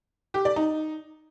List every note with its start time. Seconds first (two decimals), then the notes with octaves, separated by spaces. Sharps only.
0.34 G4
0.45 D5
0.56 D#4